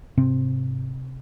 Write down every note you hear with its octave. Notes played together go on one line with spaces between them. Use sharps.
G#2 C3 C4